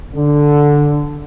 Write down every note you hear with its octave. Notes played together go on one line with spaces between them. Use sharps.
D3